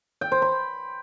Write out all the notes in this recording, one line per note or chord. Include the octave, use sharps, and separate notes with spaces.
G5
C5
B5